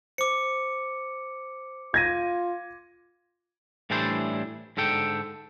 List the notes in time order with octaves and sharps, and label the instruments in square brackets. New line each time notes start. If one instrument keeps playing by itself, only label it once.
[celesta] C5 [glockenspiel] D6 C#7
[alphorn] F4 [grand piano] G#6 A#6 D#7
[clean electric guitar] A2 E3 G3 D4 E4 C5
G#2 D3 A4 G5